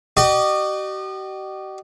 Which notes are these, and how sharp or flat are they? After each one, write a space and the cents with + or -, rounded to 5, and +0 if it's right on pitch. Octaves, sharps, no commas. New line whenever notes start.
G4 -45 D#5 -40